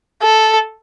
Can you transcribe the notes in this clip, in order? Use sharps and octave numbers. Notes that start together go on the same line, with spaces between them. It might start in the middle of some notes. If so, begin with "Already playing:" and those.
A4